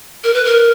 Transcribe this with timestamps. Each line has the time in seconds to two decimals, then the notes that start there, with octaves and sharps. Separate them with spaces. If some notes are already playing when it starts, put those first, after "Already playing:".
0.24 A#4
0.34 B4
0.45 A#4